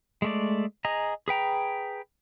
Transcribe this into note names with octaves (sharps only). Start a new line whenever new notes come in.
G#3 A3 D5
G#4 D#5 A#5
G#4 B4 G5 A#5